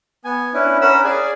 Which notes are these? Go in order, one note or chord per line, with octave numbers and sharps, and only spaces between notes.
B3 G#5
C#4 D4 E4 B4
C#4 A#4 F#5 B5 E6
G#4 D5 G#5